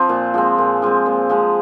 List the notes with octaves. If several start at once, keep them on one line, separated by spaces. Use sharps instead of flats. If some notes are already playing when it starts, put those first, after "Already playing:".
Already playing: F3 C4
A#2
F3 G#3 C4
A#2
F3 G#3 C4
A#2
F3 G#3 C4